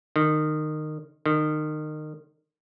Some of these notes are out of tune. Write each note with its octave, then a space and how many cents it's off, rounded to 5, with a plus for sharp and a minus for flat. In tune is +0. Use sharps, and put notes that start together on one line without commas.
D#3 -20
D#3 -25